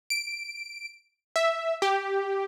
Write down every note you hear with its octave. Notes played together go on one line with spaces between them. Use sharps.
D7
E5
G4